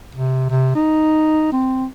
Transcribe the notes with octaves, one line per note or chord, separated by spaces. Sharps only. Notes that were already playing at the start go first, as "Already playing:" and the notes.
C3
C3
D#4
C4